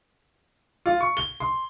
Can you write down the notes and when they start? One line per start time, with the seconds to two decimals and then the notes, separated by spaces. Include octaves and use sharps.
0.86 F4
1.01 C#6
1.17 G7
1.40 C6